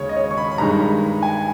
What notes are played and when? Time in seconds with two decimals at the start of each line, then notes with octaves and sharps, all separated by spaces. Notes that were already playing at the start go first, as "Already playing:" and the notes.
Already playing: D#2 C#3 G#3 C#5
0.09 D#5
0.16 C#5
0.31 C#6
0.38 B5
0.51 B5
0.58 G2 D#3 G#3 A#5
1.23 G#5